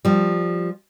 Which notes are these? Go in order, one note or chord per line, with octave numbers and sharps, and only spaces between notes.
F3 G3